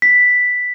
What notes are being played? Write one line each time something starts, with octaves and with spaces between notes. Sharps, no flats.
B6